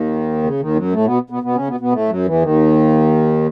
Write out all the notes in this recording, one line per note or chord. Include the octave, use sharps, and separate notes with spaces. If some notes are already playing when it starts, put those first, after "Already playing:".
Already playing: D#2 D#3
C#3
D#2 D#3
F#2 F#3
A2 A3
B2 B3
B2 B3
B2 B3
C#3 C#4
B2 B3
B2 B3
A2 A3
F#2 F#3
E2 E3
D#2 D#3